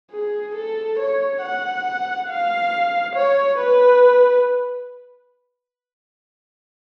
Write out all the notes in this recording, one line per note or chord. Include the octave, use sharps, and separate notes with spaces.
G#4
A4
C#5
F#5
F5
C#5
B4